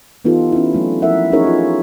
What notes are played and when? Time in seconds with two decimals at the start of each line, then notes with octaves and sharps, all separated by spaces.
0.25 E3 B3 D#4 F4 G4 A4
0.52 C#4 E4
0.73 F#3 A3 C4
1.02 F3 E4 A#4 E5 F#5
1.32 C#4 D#4 F#4 G#4 A#4 C#5
1.45 F3 C#4 F4